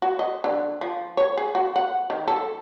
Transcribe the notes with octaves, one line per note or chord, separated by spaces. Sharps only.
F#4
D#5
D3
F3
C#5
G#4
F#4
F#5
D#3
A4